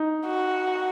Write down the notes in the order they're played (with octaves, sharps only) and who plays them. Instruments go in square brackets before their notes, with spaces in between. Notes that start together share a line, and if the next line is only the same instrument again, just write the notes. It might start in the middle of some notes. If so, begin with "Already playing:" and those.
Already playing: [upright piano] D#4
[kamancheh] F#4